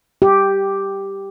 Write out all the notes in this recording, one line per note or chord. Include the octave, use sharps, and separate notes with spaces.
G4